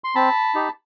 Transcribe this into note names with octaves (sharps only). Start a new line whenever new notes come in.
C6
C4 A5 B5
D#4 G4